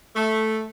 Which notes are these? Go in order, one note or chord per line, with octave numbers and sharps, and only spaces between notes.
A3